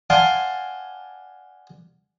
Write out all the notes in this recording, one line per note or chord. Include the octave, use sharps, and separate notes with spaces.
D5 F5 F#5 G#5 A5 C6